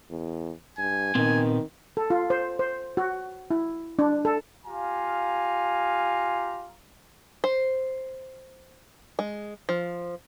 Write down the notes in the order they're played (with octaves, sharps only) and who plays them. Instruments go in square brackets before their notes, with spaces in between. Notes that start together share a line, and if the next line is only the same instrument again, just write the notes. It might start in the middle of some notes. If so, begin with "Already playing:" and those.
[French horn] E2
[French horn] G2 [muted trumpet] G#5
[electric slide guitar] A#2 B3 C4 [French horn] D#3
[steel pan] A4
F4
C5
C5
F#4
E4
D4
A4
[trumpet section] F4 G4 F5 G#5 A#5
[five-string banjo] C5
G#3
F3